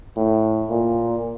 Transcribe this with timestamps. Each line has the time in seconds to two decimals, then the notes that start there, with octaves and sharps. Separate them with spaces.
0.16 A2
0.70 A#2